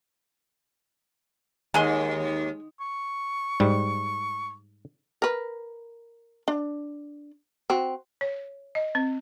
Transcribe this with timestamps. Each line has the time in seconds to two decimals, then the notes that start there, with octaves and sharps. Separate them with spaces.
1.74 D#2 G#3 G#4 C6
2.80 C#6
3.60 G#2 G3
5.22 A#4 B4
6.48 D4
7.70 C4 F#4
8.21 C#5
8.75 D#5
8.95 C4